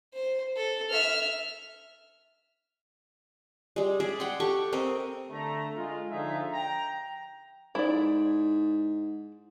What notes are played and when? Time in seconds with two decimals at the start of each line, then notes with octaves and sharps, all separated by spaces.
0.14 C5
0.57 A4
0.90 E5 F6
3.76 G3 G#3
4.00 G#4 D5 E5
4.20 F#5 G5 C6
4.40 G4 A4 C#6
4.73 C4 A#4 D#5
5.31 D3 A3 A#5
5.76 G#3 F4
6.10 D3 F3 D#4 F4 G#4 E5
6.53 G5 A#5
7.75 G#2 E4 D5